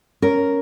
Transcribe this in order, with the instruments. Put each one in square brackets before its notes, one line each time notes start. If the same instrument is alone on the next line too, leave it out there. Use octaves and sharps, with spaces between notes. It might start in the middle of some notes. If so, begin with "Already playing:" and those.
[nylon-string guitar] C#4 A#4